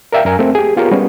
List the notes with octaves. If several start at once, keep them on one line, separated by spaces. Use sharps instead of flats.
A#4 D5 E5 F5 G5
F#2 A#4 G#5
A3 C4
G4 G#4
B3 F4 G4 G#4 A#4 C#5
G3 G#3 B3 C#4